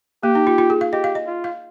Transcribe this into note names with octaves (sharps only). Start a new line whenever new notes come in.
A#3 G4
D#4
F4
F4
G#4
F5
G4 D#5
F5
D#5
F4
F5